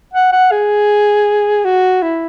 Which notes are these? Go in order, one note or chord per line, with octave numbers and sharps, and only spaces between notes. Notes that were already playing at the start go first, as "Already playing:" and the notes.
F#5
F#5
G#4
F#4
E4